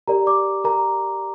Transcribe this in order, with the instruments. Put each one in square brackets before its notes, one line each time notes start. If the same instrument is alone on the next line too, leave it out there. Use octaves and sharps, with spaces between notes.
[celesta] G4 A#4 D5 A#5
D5 D6
A#4 A#5